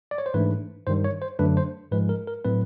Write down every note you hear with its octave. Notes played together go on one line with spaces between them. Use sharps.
D5
C#5
C5
G#2 E3 A3 D4 B4
G2 D#3 G3 C5
C#5
C5
F#2 D3 F#3 A3 D4 B4
C5
G#2 F3 G#3 B4
A#4
A#4
A2 F#3 A3 C4 B4